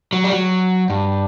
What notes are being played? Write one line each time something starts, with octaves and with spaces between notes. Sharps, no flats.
F#3
G3
F#3
G2